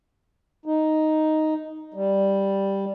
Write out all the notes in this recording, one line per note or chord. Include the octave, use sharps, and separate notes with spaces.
D#4
G3